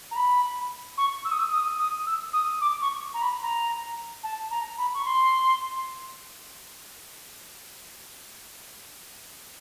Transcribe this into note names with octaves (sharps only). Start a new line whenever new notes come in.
A#5
B5
C#6
E6
D#6
E6
D#6
D#6
E6
D#6
D6
C#6
A#5
B5
A#5
A5
A#5
B5
C#6
C6